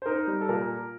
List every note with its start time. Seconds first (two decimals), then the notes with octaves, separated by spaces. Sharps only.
0.02 C5
0.06 D#4 A#4
0.27 G3
0.41 A4
0.49 A#2 A#4